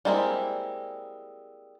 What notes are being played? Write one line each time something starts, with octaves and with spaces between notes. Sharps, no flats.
G3 G#3 A#3 C4 E4